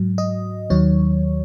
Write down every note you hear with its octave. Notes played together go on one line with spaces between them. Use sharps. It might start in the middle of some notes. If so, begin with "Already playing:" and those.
Already playing: G#2 F#3
D#5
D#2 D#3 F#3 C#5